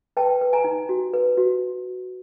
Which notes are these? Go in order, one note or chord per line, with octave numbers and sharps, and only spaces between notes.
B4 G5 A5
B4
G#5 A#5
D#4
F#4
B4
F#4